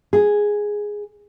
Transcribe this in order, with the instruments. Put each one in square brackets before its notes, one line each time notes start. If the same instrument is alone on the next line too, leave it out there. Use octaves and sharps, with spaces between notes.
[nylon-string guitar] G#4